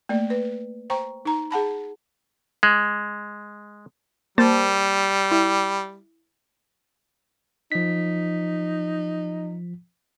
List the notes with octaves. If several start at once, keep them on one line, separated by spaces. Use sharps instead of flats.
A3 A#3 D5
B4
C5 G5 A#5 C#6
D#4 A#5
G#4 F#5 A5 B5
G#3
G3 A#3 C5 A5
E4
F3 D#4 B6